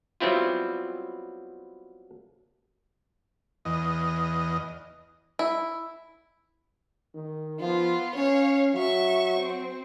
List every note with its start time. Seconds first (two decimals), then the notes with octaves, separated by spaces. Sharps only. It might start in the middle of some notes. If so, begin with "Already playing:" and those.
0.20 F#3 G3 B3 C4 E4 F4
3.65 E2 D#5
5.39 E4
7.14 D#3
7.60 F3 B3 F4
8.16 C#4 C#5 F5
8.74 F#3 E5 C#6
9.37 C4